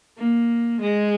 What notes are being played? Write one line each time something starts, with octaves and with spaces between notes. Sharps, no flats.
A#3
G#3